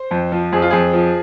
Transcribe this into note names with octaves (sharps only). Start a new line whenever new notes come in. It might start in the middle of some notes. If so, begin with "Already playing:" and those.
Already playing: C5
F2
F3
F2 G#4
F4
F2 G#4
F3